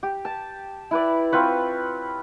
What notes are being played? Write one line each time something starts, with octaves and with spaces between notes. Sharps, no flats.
G4
A5
E4 B4 D5
C4 F4 B4 C#5